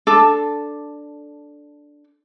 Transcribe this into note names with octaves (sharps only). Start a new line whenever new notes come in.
D4 A4